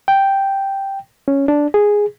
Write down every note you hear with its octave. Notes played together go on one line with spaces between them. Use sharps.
G5
C#4
D4
G#4